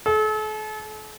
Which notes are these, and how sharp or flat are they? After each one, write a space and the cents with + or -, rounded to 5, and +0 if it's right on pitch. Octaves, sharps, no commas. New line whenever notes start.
A4 -40